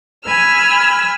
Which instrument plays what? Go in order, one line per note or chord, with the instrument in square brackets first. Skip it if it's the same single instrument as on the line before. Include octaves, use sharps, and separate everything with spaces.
[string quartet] G#5 B5 E6 F6